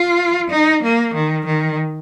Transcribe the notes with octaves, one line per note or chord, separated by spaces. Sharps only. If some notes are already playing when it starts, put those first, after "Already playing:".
Already playing: F4
D#4
A#3
D#3
D#3